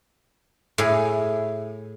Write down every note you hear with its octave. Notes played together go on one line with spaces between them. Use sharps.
A2 G#4